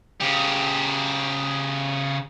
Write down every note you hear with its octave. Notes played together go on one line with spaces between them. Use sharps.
C#3 G4